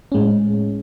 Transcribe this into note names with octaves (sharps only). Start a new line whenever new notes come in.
A2 G#3 C#4